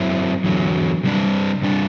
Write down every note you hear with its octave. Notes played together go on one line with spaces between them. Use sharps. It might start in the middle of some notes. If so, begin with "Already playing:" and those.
Already playing: F#2 F#3 C4 E4
E2 D3 F#3
C3 G3 D4
C3 G3 D4